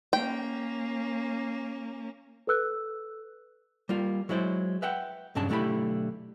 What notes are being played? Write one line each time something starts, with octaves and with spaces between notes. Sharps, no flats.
A#3 C#4 G5
A4 B4 E6 F#6
G3 A#3 F4
F#3 G#3 E4 C5 D5
B4 E5 F#5 G5
B1 G2 C#3 D4 A5
B1 D3 A3 E4 G4 B5